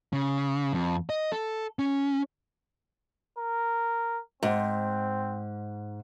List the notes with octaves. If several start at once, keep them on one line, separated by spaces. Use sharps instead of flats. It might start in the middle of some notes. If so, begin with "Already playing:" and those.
C#3
F2
D#5
A4
C#4
A#4
G#2 C4